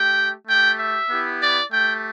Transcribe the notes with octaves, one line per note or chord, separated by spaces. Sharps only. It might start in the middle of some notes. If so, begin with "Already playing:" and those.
Already playing: A3 G4 G5
A3 G4 G5
E5
B3 E4 G4
D5
A3 G4 G5